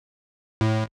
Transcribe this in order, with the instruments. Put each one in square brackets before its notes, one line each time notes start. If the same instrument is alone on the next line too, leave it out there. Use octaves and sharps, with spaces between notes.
[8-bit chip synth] A2